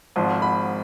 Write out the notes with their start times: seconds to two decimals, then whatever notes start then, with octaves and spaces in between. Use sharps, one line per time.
0.16 G#1 G#2 F3 C6
0.42 B5